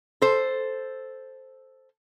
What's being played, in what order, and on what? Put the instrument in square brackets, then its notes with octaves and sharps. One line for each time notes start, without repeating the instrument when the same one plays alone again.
[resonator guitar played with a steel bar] A4 C5